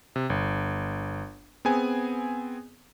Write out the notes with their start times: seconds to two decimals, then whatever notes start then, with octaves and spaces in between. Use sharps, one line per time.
0.16 C3
0.30 G1
1.65 B3 C4 G#4 G#5